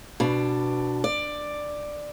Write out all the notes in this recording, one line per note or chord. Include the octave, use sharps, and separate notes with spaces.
B2 D4
D5